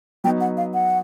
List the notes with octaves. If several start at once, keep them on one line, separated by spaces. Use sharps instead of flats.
F#3 B3 D#4 G5
F#5
F5
F#5